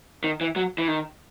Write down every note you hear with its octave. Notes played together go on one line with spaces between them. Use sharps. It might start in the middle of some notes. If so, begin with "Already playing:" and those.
D#3
E3
F#3
E3
D#3